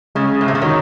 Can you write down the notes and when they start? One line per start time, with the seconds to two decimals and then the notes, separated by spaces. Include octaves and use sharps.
0.15 C#3 G#3
0.41 A2
0.48 C3
0.55 C#3
0.62 D#3 D#4 F#4 C#5